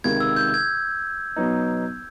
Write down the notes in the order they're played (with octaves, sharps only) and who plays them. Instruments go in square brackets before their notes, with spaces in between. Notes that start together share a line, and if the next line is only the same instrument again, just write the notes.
[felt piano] C#2 C3 D#3 [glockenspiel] G#6
[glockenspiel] E6
G6
G#6
[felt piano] B2 F#3 B3 D#4